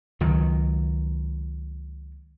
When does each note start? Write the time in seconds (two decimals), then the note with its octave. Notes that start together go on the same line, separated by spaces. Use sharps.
0.20 C#2 D#3 F#3